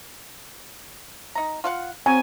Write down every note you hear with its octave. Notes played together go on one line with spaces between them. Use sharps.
D#4 A#5
F4 F5 F#5
F#3 C4 G#5